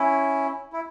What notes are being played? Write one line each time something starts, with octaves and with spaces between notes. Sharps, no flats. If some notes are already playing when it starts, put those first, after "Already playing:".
Already playing: C#4 E4
E4